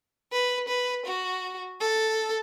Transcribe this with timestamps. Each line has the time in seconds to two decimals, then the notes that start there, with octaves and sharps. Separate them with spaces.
0.32 B4
0.68 B4
1.06 F#4
1.80 A4